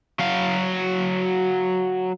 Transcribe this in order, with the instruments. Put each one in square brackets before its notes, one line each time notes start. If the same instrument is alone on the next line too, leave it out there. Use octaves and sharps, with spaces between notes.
[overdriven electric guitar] F#3 F5